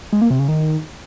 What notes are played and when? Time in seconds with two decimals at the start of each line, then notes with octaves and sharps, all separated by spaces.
0.13 G#3
0.21 A#3
0.30 C3
0.39 C#3
0.48 D#3